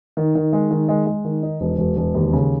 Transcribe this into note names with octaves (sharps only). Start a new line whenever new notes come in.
D#3
D#3
G#3
D#3
G#3
G#3
D#3
D#4
E1
E1
E1
D#2
C#3